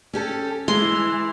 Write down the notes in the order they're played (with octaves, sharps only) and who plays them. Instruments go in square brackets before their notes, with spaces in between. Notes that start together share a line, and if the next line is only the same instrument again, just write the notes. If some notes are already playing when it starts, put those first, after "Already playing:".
[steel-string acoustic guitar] C#4 G4 A4
[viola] E3 [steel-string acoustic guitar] G#3 [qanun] C6